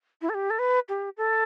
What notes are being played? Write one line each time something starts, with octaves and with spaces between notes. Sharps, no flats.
E4
A4
G4
A4
B4
G4
A4